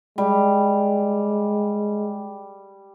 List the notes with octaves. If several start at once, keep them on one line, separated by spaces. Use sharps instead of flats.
G3 G#3